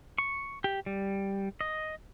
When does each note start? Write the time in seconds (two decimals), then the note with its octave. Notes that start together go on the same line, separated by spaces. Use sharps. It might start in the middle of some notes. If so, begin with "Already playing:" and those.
0.18 C#6
0.64 G4
0.86 G3
1.61 D#5